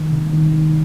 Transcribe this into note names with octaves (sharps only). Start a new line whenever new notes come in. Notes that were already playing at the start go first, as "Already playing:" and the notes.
Already playing: D#3
C3
D#3
D#3